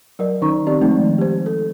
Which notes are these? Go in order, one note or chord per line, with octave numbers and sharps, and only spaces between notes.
F#3 A#4 D5
D#3 C#4 D#4 A#5 C#6
C4 G4 D5
D#3 F3 G#3 A3 C4 D#4
G4 C5
A4